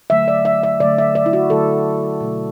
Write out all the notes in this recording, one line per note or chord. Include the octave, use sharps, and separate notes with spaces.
D3 F#3 A3 E5
D5
E5
E5
D3 F#3 A3 D5
E5
D5
E4
F#4
D3 F#3 A3 A4
B2 F#3 A3